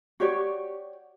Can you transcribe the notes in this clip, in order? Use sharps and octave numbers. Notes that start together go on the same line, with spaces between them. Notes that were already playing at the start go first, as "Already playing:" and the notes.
F#4 G4 C#5 D5